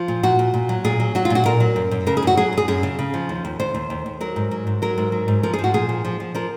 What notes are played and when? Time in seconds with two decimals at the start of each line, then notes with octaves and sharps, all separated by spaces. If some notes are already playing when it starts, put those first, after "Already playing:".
Already playing: F3 F4
0.08 A#2
0.23 A#2 F#4
0.39 A#2
0.54 A#2
0.69 F#3
0.84 A#2 G#4
1.00 F#3
1.15 F#3 F#4
1.25 F4
1.30 A#2 F#4
1.45 A#2 A#4
1.60 F#3
1.76 F#2
1.91 F#2
2.07 C#3 A#4
2.17 G#4
2.22 F#2 F#4
2.37 F#3 G#4
2.53 F#2 G#4
2.68 F#2 G#4
2.83 C#3
2.99 C#3
3.14 F3
3.29 D#2
3.45 D#2
3.60 D#2 C5
3.74 D#2
3.90 D#2
4.06 D#2
4.21 F#3 A#4
4.36 G#2
4.51 F#3
4.67 G#2
4.82 F#3 A#4
4.98 G#2
5.12 F#3
5.28 G#2
5.43 F3 A#4
5.53 G#4
5.59 F3
5.64 F#4
5.74 A#2 G#4
5.89 F3
6.05 F3
6.20 F3
6.35 F3 A#4